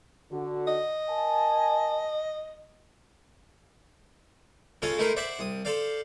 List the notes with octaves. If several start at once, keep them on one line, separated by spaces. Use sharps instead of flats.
D3 F#4
D#5
A#4 G#5 A5
C#3 G#3 F4 A4 C#5
G#3 A3 D#4 E4 A#4 C5
C5 D5 E5 F#5
C2 D#6
A4 C5 D5 F5